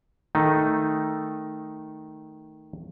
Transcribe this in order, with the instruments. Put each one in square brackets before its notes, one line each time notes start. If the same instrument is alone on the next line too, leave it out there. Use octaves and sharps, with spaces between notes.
[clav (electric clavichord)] D#3 A3 D#4